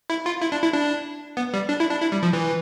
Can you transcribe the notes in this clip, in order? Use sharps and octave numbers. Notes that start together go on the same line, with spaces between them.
E4
F4
E4
D4
E4
D4
B3
G3
D4
E4
D4
E4
G3
F3
E3